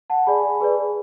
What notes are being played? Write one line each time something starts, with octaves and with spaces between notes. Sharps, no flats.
F#5 A5
G#4 D5 G#5 B5
G#4 B4 D5